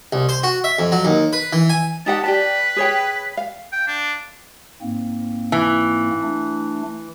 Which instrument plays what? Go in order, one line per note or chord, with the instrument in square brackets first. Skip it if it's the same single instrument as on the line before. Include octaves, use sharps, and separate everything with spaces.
[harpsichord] C2
C5
F#4
E5
F2
F#3
D#2
B4
E3
G#5
[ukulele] D#4 G4 F#5 [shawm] A5
[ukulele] G4 D5 A5 [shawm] B4
[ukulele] G#4 C#5 G5
F5
[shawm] G5
D4
[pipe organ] G#2 A#3 C4
[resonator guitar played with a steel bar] E3
[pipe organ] A3 D4